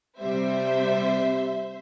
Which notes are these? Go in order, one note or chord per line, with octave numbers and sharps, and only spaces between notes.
C3 G3 C4 C5 E5